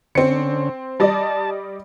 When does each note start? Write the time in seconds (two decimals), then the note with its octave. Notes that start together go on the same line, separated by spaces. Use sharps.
0.15 D3 C4 C#4 C#7
1.00 G3 D5 D#5 A5